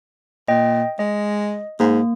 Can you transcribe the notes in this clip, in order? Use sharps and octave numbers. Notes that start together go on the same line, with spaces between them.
A#2 D#5 G5
G#3 D#5
G#2 A#3